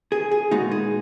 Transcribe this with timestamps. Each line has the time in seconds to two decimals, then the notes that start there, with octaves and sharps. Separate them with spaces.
0.12 G#4
0.31 G#4
0.51 A#2 G#3 B3 D#4 F#4
0.71 G#4